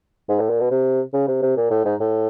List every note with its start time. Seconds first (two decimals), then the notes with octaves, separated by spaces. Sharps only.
0.29 G#2
0.40 A2
0.50 A#2
0.60 B2
0.71 C3
1.14 C#3
1.28 C3
1.42 C3
1.57 A#2
1.71 A2
1.85 G#2
2.00 A2